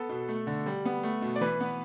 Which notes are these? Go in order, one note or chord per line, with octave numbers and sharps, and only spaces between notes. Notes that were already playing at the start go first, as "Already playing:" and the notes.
Already playing: B3 A4
B2
A3
D3
G3
B3
A3
B2
D5
E3 B4
B3